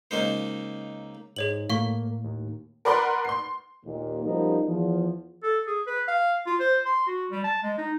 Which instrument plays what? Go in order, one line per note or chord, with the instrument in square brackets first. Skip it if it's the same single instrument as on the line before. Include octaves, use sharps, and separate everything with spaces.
[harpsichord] C#2 A#3 D#4 C5
[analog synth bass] G#2 [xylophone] G#4 C#5 F#7
[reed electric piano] A2 [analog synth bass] A#3 [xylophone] F5 C#6
[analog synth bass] D#2
[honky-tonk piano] A#4 B4 D5 F#5 B5 C6
C6 C7
[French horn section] D#2 A#2
F#2 F3 G3 B3 D#4 A#4
E2 F3
[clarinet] A4
G#4
B4
F5
F4
C5
C6
F#4
G3
A5
G#3
D#4